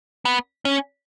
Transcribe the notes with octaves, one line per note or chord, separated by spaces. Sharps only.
B3
C#4